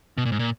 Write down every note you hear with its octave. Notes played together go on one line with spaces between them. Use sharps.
B2
A#2
G#2
A#2